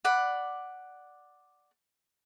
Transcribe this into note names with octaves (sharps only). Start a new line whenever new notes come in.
D5 F#5 B5